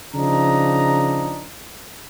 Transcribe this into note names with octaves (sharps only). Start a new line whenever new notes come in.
C#3 F3 D4 D#4 A#5